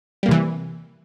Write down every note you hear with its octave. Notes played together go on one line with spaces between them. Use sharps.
C3 E3 G3 A#3